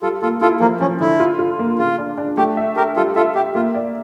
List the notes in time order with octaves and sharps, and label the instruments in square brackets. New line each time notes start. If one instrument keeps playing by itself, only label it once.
[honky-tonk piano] G3 [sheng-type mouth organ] F4 A4
[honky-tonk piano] A#3 [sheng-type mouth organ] F4 A4
[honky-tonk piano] E4 [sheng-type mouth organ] F4 A4
[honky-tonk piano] F3 [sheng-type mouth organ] A#3
[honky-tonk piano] F3 [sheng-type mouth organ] C#4
[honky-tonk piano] D3 [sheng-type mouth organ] E4
[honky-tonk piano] F4
F4
A#3
[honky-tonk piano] C#3 [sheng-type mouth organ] F4
[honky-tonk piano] D4
D4
[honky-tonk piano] A3 [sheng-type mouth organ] G4
[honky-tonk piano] E5
[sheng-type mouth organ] G4 A#4 [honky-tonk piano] A4
[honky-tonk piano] G3 [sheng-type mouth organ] F4 A4
[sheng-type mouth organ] F4 A4 [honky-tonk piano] E5
[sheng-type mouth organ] G4 [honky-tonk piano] E5
[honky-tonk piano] A#3 [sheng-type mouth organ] F4
[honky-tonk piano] D5